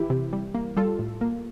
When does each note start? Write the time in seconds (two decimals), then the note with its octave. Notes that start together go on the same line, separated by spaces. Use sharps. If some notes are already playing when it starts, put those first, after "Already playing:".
Already playing: E3 E4 G4
0.10 C3
0.33 G3
0.54 A#3
0.76 G3 F4 A4
0.99 A2
1.21 A#3